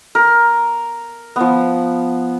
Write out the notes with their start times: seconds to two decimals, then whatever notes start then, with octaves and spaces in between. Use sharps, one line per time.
0.15 A#4
1.36 F3 B3